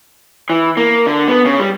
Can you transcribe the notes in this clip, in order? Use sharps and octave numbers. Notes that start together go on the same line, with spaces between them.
E3
A#3
D3
B3
C#3
G3